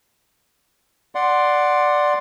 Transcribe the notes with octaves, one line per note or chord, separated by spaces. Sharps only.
D5 F#5 C6